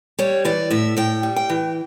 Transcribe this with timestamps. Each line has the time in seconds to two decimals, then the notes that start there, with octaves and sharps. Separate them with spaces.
0.19 G3 C#5
0.45 E3 D5
0.71 A2 E5
0.97 A2 G5
1.23 G3
1.36 G5
1.50 E3